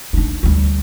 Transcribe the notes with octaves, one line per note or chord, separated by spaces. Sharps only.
D4 D#4
D2 G3